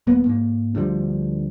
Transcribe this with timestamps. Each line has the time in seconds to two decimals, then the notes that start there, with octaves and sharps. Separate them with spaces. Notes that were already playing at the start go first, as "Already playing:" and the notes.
0.07 D#1 A#3 B3
0.26 G#2 A#3
0.75 D2 D3 F3 G3